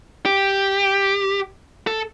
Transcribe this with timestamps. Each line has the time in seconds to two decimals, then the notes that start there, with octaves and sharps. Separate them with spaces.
0.26 G4
1.87 A4